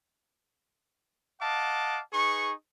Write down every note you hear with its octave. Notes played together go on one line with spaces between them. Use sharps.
D#5 F5 F#5 A5 D6
D#4 G#4 B4 C#6